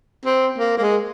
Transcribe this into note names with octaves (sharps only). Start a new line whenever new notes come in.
C4
A#3
A#3
G#3